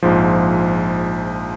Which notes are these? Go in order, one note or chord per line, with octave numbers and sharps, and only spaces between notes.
A#1 G#2 F3